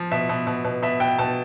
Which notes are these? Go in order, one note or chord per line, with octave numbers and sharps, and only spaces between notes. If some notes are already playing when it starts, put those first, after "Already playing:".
Already playing: F3
B2 E5
B2
B2
B2
B2 E5
B2 G5
B2 A5